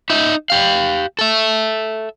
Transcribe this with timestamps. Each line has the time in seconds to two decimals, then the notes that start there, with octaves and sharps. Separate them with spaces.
0.10 D#4 E5
0.50 G4 F5
1.19 A4 E5